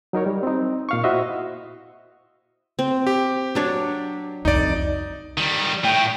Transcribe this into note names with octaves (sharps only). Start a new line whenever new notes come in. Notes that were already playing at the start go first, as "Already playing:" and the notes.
F#3 D#4 A#4 C#5
G3
C4 D#4
A#2 F5 C#6
E4 F#4 C5 D#5 E5
C4
G4
F#3 D4 C#5
C2 F2 D#4 D5
D#3 G3
A2 G5